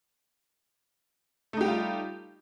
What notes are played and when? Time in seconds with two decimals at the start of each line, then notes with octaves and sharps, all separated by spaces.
1.53 A3
1.57 D#4
1.61 G4
1.64 G3
1.68 F4